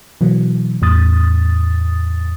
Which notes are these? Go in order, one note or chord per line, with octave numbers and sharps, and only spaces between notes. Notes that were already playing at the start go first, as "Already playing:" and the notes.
B2 E3 F#3
E2 A2 D#6 A6